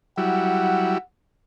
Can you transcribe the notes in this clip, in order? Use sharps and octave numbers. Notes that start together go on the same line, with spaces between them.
F#3 G3 E4 F#5